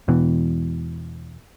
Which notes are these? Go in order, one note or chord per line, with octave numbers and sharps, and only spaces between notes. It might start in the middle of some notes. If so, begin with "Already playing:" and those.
E1 B2 E3